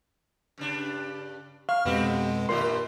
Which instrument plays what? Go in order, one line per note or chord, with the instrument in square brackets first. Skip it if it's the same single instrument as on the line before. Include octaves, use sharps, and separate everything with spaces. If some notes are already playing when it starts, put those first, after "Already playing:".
[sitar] G2 C#3 D4
[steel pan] F5 [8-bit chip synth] C#6 F6
[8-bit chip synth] F2 B2 G#3 [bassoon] B3 [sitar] C4 G4
[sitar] G2 D#3 G4 [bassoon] A#2 [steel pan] C6